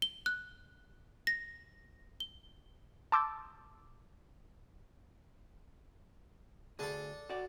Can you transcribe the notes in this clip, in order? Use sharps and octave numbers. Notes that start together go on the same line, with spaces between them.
G7
F#6
A#6
G7
A5 C6 D6 E6 G6 A6
D2 D4 G#4 A4
F#4 D5